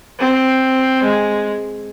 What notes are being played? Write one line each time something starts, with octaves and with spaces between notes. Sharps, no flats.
C4
G#3